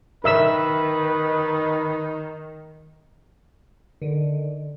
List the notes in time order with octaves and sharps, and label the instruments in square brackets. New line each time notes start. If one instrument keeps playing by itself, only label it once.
[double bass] D#3 [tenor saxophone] D#4 [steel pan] A#4 E5 E6 [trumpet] B4
[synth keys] D3 D#3